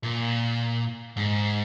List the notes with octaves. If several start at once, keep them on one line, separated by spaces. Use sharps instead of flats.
A#2
G#2